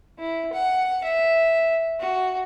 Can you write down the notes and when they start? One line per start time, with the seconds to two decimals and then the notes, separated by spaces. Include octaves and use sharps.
0.19 E4
0.53 F#5
1.04 E5
2.00 F#4